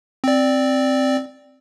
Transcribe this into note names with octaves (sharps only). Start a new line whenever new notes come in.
C4 D5